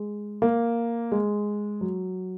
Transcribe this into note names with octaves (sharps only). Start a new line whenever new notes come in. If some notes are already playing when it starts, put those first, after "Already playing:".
Already playing: G#3
A#3
G#3
F#3